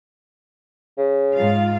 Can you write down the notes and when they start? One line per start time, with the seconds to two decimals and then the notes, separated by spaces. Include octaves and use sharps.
0.98 C#3
1.33 G#2 F4 F5